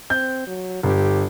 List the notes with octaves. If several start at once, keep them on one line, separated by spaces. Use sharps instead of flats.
C4 G6
F#3
G1 G4